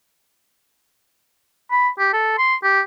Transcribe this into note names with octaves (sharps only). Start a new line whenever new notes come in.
B5
G4
A4
C6
G4